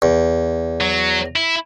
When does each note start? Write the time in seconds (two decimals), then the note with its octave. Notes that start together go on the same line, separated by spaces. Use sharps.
0.02 E2
0.81 F#3
1.36 E4